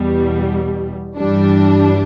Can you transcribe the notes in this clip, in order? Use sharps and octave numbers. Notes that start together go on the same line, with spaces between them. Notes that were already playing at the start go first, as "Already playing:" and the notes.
Already playing: E2 B2 G3
G2 E3 G3 D4